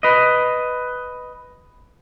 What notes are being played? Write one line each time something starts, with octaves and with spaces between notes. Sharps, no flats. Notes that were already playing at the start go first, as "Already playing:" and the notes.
B4 D#5